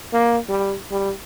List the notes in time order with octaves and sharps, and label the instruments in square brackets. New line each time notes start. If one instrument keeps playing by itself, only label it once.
[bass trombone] A#3
G3
G3